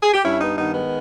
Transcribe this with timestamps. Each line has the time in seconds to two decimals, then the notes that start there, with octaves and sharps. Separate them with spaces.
0.03 G#4
0.14 G4
0.24 G2 C#4 E4
0.41 B3 D#4
0.57 D#3 B3 D#4
0.74 G#3 B3